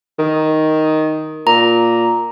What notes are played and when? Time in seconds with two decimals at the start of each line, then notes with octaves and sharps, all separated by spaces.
0.19 D#3
1.47 A#2 A#5